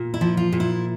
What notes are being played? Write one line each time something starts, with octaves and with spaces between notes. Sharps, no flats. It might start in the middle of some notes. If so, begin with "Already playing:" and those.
Already playing: A#2
E4
F3
F4
A#2
E4